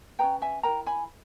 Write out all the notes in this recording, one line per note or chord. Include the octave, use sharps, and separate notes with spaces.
C#4 G#4 B4 G5 A#5
E5 G#5
E4 A#4 G5 A#5
G#5 B5